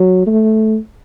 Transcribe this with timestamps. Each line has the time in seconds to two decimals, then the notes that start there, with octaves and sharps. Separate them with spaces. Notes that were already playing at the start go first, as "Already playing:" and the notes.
Already playing: F#3
0.27 A3